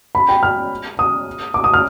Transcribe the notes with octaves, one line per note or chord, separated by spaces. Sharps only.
B5
G5
F6
D#6
D6
D#6
F6